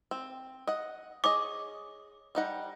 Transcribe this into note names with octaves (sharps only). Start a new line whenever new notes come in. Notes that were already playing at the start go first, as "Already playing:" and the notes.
C4
D#5 F#5
G#4 C#5 D#5 D6
G3 D#4 F#5